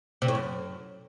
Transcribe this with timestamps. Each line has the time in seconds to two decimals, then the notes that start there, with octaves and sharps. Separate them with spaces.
0.22 C3
0.28 A2
0.35 F#2